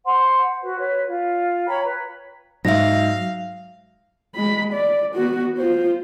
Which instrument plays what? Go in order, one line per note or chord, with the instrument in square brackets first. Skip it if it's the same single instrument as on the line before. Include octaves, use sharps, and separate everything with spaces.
[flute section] C5 F#5 C6
F#4 B4
B4 C#5
F4
C#5 G5 A#5 B5
B4
[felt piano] G#2 [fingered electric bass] F#3 [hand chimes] E5 A#6 [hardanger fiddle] F5
[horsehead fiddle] G#3 B5
D5
B3 F#4
F4 C5